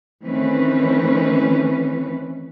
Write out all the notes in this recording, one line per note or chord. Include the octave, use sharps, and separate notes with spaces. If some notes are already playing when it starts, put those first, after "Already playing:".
D#3 E3 A3 C4 C#4 B4